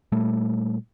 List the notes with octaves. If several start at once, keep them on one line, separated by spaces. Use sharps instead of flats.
A#2 G3 A3